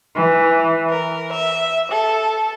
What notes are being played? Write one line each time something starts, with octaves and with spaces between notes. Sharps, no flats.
E3
A#4
E5
A4